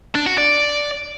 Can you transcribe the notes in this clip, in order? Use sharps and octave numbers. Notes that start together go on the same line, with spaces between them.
D4
F#4
D5